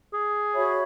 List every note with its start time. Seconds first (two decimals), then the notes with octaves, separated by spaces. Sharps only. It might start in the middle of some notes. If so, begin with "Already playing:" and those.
0.13 G#4
0.55 F#4 C#5 E5 B5